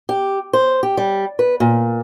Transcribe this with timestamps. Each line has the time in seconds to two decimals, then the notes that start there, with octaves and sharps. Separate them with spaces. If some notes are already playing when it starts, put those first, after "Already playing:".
0.09 G4
0.53 C5
0.83 G4
0.97 G3
1.39 B4
1.60 A#2